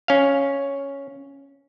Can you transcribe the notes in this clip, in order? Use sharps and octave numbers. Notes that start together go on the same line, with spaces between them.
C#4 F5